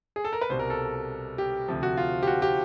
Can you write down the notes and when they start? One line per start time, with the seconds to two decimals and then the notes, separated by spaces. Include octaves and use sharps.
0.16 G#4
0.25 A4
0.33 A#4
0.41 B4
0.50 C2 B2 G3 C5
0.59 A#4
0.70 A4
1.38 G4
1.68 D2 C3 F3
1.83 F#4
1.97 F4
2.23 G4
2.27 F#4
2.42 G4